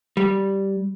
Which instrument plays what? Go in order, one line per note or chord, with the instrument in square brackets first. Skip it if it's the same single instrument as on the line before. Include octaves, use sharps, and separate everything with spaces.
[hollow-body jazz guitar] G3